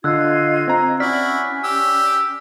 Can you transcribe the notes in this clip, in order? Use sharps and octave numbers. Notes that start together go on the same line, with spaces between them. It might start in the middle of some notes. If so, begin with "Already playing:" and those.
D3 F4 D#5 E6 F#6 G#6
C4 A#5
C#4 E4 F#4 D5 F6 B6
G4 E6